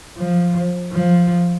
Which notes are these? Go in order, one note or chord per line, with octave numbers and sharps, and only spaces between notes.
F3
F3